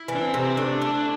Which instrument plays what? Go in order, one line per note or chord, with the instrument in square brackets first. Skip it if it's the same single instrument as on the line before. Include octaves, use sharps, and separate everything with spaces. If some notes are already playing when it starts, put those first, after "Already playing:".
Already playing: [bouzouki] E4
E3
[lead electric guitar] D4
C4
[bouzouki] C3
[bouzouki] A3 [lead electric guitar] D4
[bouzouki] E4